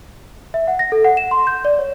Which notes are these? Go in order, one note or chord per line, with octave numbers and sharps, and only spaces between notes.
E5
F#5
A#6
A4
F#5
E7
C6
G6
D5
C#5